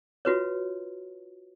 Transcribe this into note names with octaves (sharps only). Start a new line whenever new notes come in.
F4 F#4 B4 C#5